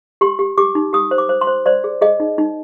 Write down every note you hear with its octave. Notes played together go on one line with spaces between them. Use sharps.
G4 C6
G4
G4 D6
D#4
G4 D#6
C5
D6
C5
C6
C5
C5 D5
G#4
G#4 D#5
D#4
D#4